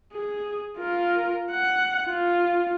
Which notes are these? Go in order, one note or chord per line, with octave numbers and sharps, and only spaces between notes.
G#4
F4 A#4
F#5
F4